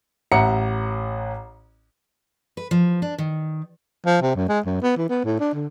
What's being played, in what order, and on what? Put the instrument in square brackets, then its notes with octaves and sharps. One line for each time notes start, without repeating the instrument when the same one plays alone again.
[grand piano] A1 E5 F#5 A#5 C#7
[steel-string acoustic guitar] B4
F3
D4
D#3
[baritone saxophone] F3
C3
F#2
G#3
F#2
B3
E3
B3
A2
D4
D3